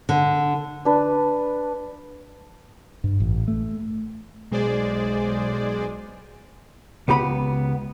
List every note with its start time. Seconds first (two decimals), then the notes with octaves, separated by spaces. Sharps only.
0.09 D3
0.85 D4 B4
3.04 G2
3.20 A1
3.48 A3
4.51 B1 G#3 G#4 C5 D5
7.08 C#2 B3 G4 B5